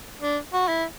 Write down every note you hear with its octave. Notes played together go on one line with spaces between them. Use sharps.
D4
F#4
E4